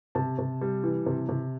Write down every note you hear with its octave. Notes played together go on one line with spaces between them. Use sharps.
C3 A5
C3
G3
E3
C3
C3